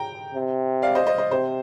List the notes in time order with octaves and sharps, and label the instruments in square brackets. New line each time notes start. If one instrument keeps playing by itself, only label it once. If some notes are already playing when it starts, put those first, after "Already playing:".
Already playing: [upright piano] G5 A#5
[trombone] C3
[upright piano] D5 F5
C5 D#5
C5 D#5
C5 D#5
[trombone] C3 [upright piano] C5